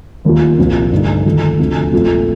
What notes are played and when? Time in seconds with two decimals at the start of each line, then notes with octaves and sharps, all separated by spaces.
0.25 D#2 D#3 A#3 F4
0.58 C2 A#2 F3
0.92 G2 D3 A3 D#4
1.25 D#2 D3 F3 A3
1.59 D2 C3 F3 A3 D4
1.92 A#1 A#2 F3 A3 C4